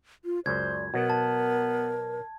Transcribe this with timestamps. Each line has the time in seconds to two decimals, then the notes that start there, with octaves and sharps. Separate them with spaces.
0.25 F4
0.46 C#2 F#2 C5 D5 G#6
0.94 B2 F#3 B3 A#4
1.10 A5